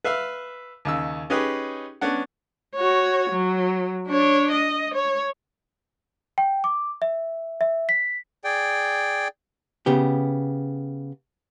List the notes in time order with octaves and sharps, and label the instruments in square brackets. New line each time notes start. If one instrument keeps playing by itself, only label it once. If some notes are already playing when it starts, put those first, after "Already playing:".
[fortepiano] B4 E5 F5 E6
D#2 C#3 E6
C#4 D#4 G4 G#4 B4
B3 C#4 D4 F#5
[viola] F#4 C#5
F#3
D4 C#5
D#5
C#5
[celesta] G5
D6
E5
E5
B6
[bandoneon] G#4 D5 G5
[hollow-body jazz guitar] C#3 B3 G4